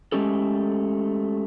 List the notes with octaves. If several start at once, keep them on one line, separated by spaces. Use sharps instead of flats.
G#3 A3 C#4 G4 A4